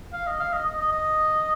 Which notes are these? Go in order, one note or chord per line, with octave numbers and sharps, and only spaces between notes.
F5
D#5
F5
D#5
D#5
D#5
D#5